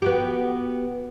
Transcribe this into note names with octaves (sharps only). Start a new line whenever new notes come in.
B3 F#4 G4